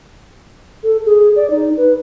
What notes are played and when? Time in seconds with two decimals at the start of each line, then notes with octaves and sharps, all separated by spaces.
0.83 A4
1.05 G#4
1.36 D5
1.50 D#4
1.77 B4